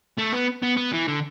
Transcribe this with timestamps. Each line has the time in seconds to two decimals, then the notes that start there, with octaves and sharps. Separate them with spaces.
0.18 A3
0.33 B3
0.63 B3
0.77 B3
0.93 E3
1.08 D3